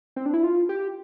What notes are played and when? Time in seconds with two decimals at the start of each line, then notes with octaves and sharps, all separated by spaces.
0.16 C4
0.26 D4
0.34 E4
0.43 F4
0.69 G4